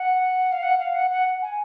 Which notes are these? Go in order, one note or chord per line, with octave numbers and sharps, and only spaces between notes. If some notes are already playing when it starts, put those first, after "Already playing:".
Already playing: F#5
F5
F#5
F5
F#5
F#5
G#5